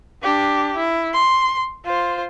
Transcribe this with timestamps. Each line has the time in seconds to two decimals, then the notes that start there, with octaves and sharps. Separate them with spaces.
0.23 D4 G4
0.77 E4
1.14 C6
1.85 F4 C5